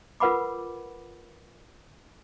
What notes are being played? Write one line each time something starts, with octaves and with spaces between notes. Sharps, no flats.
F4 A#4 B4 F#5 B5 D6